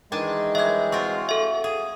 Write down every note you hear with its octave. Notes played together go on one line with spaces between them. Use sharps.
D#3 E3 G#3 D4 G#5 A5
F#3 G3 E5 G#6
C4 F4 F#4 A#4 C#6
A4 E5
G#4